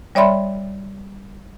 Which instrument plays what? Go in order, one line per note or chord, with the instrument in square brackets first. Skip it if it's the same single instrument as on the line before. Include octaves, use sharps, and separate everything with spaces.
[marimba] G3 C#5 D5 E5 B5 C6